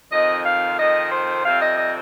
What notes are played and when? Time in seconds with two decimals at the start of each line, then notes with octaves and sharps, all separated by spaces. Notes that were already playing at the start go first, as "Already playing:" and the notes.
0.12 F2 D#3 C4 D#5
0.46 F5
0.79 F2 D#3 C4 D#5
1.12 C5
1.45 F2 C3 G3 C4 F5
1.62 D#5
1.78 D#5